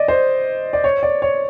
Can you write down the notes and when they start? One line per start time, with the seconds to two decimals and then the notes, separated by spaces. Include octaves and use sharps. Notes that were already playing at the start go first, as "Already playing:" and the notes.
Already playing: D5 D#5
0.08 C5
0.73 D5
0.84 C#5
1.03 D5
1.22 C#5